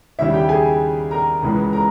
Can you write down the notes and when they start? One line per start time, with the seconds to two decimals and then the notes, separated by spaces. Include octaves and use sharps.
0.19 D#2 C#3 G3 E4 E5
0.33 G4 G5
0.49 G#4 G#5
1.11 A#4 A#5
1.43 C#2 C#3 E3 G#3
1.73 A#4 A#5